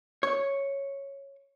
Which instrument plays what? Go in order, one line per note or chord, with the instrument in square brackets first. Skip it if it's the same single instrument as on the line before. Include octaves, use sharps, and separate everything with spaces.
[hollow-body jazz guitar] C#5